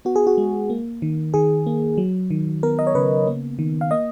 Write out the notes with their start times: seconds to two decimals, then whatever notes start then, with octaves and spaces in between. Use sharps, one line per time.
0.05 B3 F#4
0.16 G#4
0.27 F#4
0.38 G#3
0.70 A#3
1.02 D#3
1.34 D#3 G#4
1.66 A#3
1.98 F#3
2.31 D#3
2.63 B3 A#4
2.79 D#5
2.87 C#5
2.95 C#3 B4
3.27 A#3
3.59 D#3
3.81 F5
3.91 A#3 D#5